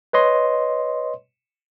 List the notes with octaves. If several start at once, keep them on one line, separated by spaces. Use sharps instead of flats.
B4 C#5 D#5 C6